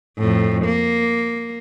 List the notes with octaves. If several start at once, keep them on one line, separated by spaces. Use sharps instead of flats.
F2 A2
A#3